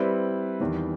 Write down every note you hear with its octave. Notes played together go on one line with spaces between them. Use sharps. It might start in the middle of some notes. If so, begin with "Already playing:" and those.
Already playing: G3 C4 E4 B4
E2 D#3 G3